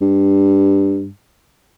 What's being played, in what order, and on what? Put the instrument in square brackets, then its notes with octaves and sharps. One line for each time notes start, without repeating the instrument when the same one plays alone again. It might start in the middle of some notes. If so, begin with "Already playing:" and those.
[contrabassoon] G2